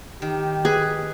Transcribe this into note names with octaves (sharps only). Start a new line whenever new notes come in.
D#3 G4
G#4 B4